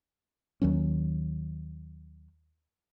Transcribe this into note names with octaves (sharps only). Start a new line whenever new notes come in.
D#2 D#3 F#3 C#4